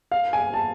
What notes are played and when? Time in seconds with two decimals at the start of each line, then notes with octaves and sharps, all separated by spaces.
0.11 F5
0.33 G#5
0.54 A5